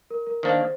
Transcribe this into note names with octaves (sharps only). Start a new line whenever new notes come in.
A#4
A#4
D#3 A#3 D4 C5